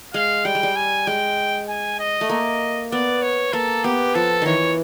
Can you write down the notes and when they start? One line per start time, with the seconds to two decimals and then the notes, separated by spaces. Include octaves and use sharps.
0.14 G#3 F5
0.45 G3 G5
0.55 G#3
0.63 G3
0.76 G#5
1.07 G#3 G5
1.69 G#5
2.00 D#5
2.21 A3
2.30 A#3 D#5
2.92 B3 D5
3.22 C#5
3.53 A#3 A4
3.84 B3 G4
4.15 F3 A4
4.42 D#3 E3 C#5